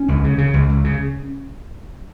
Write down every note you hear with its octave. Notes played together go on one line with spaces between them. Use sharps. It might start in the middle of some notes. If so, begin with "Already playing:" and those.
Already playing: C#4
C#2
C#3
C#3
C#2
C#2
C#3